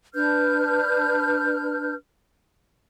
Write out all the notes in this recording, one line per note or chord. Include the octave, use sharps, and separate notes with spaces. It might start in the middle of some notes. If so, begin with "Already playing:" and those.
D4 B4 F6 G6